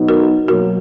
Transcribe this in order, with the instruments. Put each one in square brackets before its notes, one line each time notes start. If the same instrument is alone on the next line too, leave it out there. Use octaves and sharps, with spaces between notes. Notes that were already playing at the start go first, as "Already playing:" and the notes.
Already playing: [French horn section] B2 F#3 B3 D#4
[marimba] F#4 A#4
[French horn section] B2 F#3 A#3 [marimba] F#4 A#4